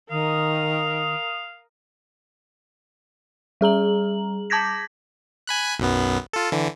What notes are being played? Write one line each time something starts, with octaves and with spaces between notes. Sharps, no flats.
D#3 A#4 F5 D#6
G3 G#4 A#5 F#7
A5 D6 G6 G#6 A#6 B6
G#5 B5 F#6
B1 F#2 B3
F4 A4
D3 E3